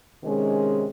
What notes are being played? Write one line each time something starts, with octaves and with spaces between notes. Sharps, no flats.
C3 D#3 G#3 C#4